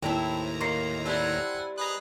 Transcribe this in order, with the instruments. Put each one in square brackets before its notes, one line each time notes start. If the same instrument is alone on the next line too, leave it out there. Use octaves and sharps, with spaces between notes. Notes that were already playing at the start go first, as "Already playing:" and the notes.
[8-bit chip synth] D#2 A2 A#5 [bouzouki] C4 D4 E4 [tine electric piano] G5 A5
[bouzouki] D#3 A#3 [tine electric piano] C6 A#6 C7
[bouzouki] G3 C4 E4 [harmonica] A4 F#5 G#5
[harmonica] G#4 B4 D#5 [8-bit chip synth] A#5 F#6